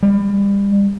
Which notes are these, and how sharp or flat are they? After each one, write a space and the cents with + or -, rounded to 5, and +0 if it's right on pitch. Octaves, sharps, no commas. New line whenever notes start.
G3 +30